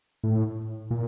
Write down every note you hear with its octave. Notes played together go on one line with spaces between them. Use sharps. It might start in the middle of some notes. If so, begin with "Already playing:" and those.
A2
A#2